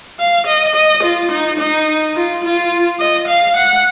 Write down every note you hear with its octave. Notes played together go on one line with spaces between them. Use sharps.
F5
D#5
D#5
F4
D#4
D#4
F4
F4
D#5
F5
F#5